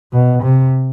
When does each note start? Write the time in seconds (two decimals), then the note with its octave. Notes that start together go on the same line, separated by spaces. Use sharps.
0.13 B2
0.43 C3